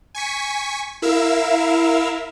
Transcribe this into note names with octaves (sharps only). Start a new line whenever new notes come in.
G#5 C#6 B6
E4 A#4 E5 F5 E6